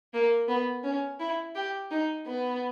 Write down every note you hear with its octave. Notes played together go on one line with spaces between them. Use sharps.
A#3
B3
C#4
E4
G4
D#4
B3